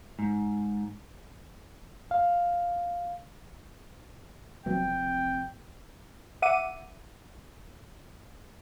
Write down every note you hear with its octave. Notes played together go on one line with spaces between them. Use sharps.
G#2
F5
F1 F2 B2 E3 F#3 C4 G5
E5 F#5 D6 D#7